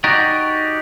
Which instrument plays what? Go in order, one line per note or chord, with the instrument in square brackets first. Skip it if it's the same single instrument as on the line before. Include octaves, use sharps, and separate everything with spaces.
[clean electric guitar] D#4 F#4 G4 D5